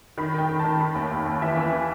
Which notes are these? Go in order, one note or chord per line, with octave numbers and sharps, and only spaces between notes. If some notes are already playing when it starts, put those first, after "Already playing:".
D#3 B5
D#3 G5
D#3
A5
D#3
D#3 B5
D#2
D#2
D#2
E3 E5
E3